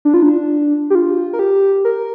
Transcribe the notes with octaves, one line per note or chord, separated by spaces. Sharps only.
D4
F4
D4
G4
F4
A#4
G4
A#4